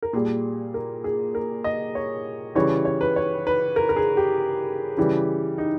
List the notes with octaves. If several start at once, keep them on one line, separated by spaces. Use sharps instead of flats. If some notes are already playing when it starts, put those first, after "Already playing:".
A#4
A#2 G3 G#4
A#4
G#4
A#4
D#5
C#5
C#3 E3 G3 C#5
C#5
B4
C#5
B4
A#4
A#4
G#4
G4
C#3 E3 G3
D#4